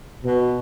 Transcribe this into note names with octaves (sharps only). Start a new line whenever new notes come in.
B2